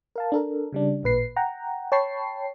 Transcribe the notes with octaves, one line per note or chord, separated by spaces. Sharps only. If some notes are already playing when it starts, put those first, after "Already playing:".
A#4 F5 A5
D4 A4 A#4
C#3 G3 D4
A1 A#2 B4 C7
F#5 G5 A#5
C#5 G5 A5 B5 C#6 C7